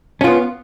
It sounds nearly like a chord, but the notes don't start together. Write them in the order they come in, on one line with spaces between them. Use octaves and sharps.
C#4 F4 B3